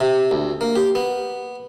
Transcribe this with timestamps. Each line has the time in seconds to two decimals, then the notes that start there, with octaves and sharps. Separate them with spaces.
0.01 C3
0.31 D2
0.61 A#3
0.76 G4
0.95 B3